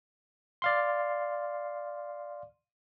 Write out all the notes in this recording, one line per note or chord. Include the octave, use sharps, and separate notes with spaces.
D5 F5 C6